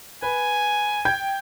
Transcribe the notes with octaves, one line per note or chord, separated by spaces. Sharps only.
B4 G#5
G5 G6 G#6